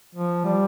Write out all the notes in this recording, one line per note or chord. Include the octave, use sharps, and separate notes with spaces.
F3
G3